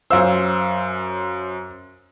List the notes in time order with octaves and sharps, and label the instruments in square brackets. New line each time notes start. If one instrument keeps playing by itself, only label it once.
[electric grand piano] F#2 C5 [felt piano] C#4 F5 E6